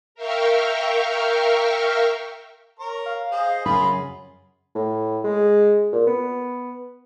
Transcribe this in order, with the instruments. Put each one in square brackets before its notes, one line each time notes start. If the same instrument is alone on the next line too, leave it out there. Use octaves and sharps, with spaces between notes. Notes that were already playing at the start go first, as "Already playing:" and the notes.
[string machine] A#4 E5 F5 G5 C#6 F6
[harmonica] A#4 C#5 A#5
[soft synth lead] F5
[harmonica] G#4 C5 D#5
[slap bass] F#2 C#3 F#3 [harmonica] F4 G#4 A#4 [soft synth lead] B5
[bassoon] A2
G#3
A#2
B3